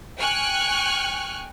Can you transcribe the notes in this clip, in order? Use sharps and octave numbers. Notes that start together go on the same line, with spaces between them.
G5 G#5 C#6 F6 F#6